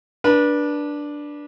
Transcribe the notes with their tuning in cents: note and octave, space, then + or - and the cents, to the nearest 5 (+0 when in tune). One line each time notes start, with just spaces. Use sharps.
D4 +0 B4 -30